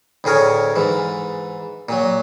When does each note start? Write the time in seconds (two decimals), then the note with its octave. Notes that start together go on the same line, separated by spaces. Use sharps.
0.24 D2 A2 G#4 A#4 C#5
0.76 G#2 E3
1.89 A#2 F#3